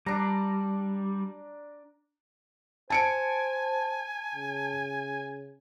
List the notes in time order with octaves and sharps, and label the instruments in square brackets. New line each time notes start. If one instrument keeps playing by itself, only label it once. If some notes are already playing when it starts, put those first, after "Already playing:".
[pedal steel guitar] G3 [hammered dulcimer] D4 A#5
[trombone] C5 [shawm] G#5 [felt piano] A5 C#7 D7
[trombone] C#3